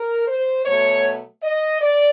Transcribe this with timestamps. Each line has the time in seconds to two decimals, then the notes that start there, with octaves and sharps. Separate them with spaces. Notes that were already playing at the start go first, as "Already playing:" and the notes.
Already playing: A#4
0.28 C5
0.66 B2 F#3 A3 C#5
1.43 D#5
1.82 D5